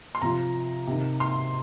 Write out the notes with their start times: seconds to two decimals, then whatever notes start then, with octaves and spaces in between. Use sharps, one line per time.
0.15 C6
0.22 C3 F3 A#5
0.87 C3 D#3
1.20 C6